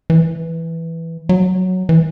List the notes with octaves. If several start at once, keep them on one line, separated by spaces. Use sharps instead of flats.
E3
F#3
E3